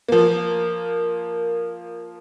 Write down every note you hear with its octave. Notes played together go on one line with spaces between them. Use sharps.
F3 A#3